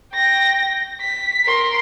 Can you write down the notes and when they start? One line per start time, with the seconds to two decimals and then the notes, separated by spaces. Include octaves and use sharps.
0.14 G5 A#6
1.01 B6
1.45 A#4 C6